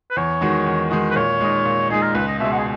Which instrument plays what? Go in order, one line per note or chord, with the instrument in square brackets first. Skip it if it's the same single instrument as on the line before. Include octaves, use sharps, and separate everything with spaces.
[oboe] B4
[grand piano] E2 [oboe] C#5
[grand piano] D#3 G#3 D#4 F#4
E2
D#3 G#3 D#4 F#4
[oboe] B4
[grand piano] A#2 [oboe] C#5
[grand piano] G#3 D#4
A#2
[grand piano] G#3 D#4 [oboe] G#4
[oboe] A#4
[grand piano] C#2 [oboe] B4
[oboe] D#5
[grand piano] B2 G#3 [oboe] E5
[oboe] F#5
G#4